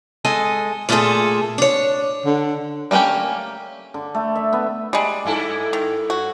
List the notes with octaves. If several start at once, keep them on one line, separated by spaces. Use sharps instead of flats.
G#3 A4 D#5 G#5
A#2 A3 F4 F#4 G#4 A4
D4 C#5
D3
G3 A3 A#3 C#4 G4
D3
A3
E5
B3
G3 G#3 D4
G2 E4 A4
D#3
F#4